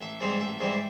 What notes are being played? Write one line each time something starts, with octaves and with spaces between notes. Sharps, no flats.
A1 E5
G#2 E3 G3 C4
A1 E5
G#2 E3 G3 C4